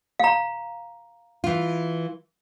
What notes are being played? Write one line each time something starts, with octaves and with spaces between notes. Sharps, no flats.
F5 A#5
E3 F4